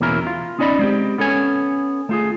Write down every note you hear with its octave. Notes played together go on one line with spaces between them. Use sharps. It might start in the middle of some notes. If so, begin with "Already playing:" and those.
E2 B2 A#3 C#4 E4 A#4
F4
B3 C#4 D#4 D5 D#5 B5
G#3 C4 G4
B3 C#4 A4 C#5 G#5
A3 F4 G#4